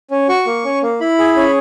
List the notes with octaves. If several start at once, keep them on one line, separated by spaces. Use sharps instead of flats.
C#4
F#4 C#6
A#3
C#4
A#3
E4 B5
G#4
C#4